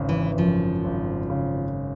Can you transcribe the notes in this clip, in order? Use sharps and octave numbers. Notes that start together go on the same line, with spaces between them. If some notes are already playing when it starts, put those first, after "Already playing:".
Already playing: G#1 C#3
E3
F#2 F3
G#1
C#3